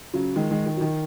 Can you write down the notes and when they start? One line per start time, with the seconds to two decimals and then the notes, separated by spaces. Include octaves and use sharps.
0.14 C#3 F#3
0.36 D#3 G#3
0.51 D#3 G#3
0.66 D#3
0.77 F#3
0.81 D#3